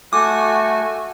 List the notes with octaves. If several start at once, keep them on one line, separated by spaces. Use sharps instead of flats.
A3 F#4 G#5 D6